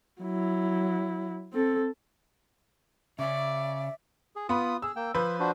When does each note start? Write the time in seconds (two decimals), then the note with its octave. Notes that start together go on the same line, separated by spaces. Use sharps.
0.21 F#3 E4
1.53 C4 A4
3.19 C#3 C#4 D5 E5
4.36 G#4
4.49 B3 F4 B5 D#6
4.82 G#4 E6
4.96 A#3 G5
5.14 F3 B4 C5
5.40 D4 F#4 C5